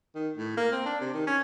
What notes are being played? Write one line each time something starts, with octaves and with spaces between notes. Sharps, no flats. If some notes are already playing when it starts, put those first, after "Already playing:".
D#3
A2
A#3
C4
D4
C3
D#3
C#4